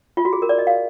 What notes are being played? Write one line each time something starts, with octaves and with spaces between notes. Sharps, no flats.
F4
F#4
G#4
A#4
D5
D#5
F5